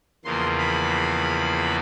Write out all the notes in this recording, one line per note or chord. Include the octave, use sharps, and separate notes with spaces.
E2 C#3 F3 A#3 C6
B5